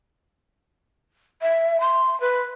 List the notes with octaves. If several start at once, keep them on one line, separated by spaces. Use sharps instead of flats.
E5
C6
B4